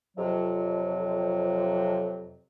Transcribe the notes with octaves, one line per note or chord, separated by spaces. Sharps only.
F2 C3 F#3